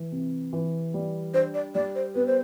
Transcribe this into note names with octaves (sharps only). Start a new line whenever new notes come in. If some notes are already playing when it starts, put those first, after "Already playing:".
Already playing: E3
C3
E3
G3
D4 C5
D5
G3 D5
C5
B3 B4
C5